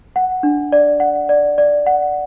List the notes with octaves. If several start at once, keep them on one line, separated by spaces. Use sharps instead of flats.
F#5
D4
D5
F#5
D5
D5
F#5